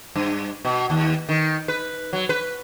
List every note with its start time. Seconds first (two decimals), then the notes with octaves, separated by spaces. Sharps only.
0.16 G2
0.65 B2
0.90 D#2
1.29 D#3
1.68 B4
2.13 F#3
2.29 B4